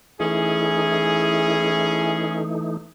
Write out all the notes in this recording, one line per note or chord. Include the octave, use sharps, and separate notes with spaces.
E3 A3 C#4 D#4 E4 G#4